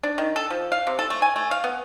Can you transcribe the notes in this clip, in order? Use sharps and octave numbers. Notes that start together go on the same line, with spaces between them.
D4
D#3
A4
F3
F5
C3
A4
A3
G#5
A3
F5
B3